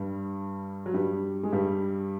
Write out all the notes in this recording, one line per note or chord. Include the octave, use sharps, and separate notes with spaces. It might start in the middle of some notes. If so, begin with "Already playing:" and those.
Already playing: G2 G3
F#3
G2 G3
G#3
G2 G3